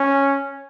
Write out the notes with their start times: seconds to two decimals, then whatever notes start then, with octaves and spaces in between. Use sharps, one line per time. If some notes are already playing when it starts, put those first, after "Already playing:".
Already playing: C#4